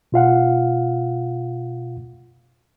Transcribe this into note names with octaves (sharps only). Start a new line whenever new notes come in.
B2 F4 F5 F#5